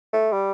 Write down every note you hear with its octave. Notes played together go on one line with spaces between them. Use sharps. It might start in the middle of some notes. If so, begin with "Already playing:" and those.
A3
G3